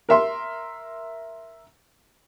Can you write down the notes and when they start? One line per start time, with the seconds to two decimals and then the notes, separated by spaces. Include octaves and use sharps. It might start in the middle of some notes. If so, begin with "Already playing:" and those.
0.09 A#4 E5 C6